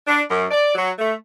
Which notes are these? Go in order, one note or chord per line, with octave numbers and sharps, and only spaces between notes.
D4
F#2
D5
F#3
A3